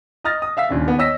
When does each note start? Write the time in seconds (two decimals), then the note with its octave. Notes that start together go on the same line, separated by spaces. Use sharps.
0.24 D#5 A#5 D#6 F6 A6 A#6
0.42 D#6
0.57 E5 F5 E6 B6
0.69 D#2 A#2 C#3 D4
0.86 D#3 B3
0.98 C#5 D#5 E6 A#6 B6